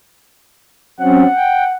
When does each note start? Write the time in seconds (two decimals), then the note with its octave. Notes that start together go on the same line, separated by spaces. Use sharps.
1.00 F#3 C4 C#4 F#5
1.36 G5